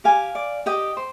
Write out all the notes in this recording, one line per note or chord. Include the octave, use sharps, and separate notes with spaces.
G4 F5 G#5
D5
G4 D#5 G5
C5